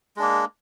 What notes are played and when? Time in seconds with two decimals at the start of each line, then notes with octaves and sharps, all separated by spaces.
0.16 G#3
0.19 D4
0.22 A#3